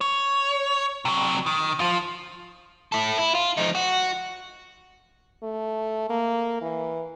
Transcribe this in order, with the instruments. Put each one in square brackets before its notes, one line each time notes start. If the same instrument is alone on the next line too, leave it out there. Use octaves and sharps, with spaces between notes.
[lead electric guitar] C#5
C3 F#3
D#3
F3 F4
[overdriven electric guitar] E4 A4
E4
F4
F3 D#4
F#4
[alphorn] A3
A#3
E3